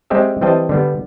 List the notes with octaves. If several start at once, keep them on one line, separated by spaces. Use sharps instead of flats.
G3 G#3 C4 G4 D#5 E5
E3 G3 C4 D#5 G5 A5
D3 G3 B3